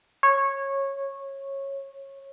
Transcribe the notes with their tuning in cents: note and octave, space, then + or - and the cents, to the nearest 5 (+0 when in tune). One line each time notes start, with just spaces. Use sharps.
C#5 -15